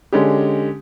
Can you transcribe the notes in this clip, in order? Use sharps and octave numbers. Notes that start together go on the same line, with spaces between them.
D3 G#3 C#4 G4